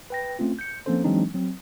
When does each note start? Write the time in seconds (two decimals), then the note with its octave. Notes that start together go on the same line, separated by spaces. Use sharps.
0.10 B4 G5 A#6
0.39 A3 C4 C#4 F4
0.59 G6 C#7
0.86 F3 A#3 C4 C#4 A4 C5
1.04 E3 F#3 G#3 C4 D4 D#4
1.34 F#3 C4